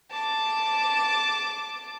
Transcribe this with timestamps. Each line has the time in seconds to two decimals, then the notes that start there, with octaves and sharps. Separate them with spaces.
0.11 A5 D6